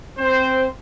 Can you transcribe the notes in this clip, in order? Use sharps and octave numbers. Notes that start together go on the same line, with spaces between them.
C4 C5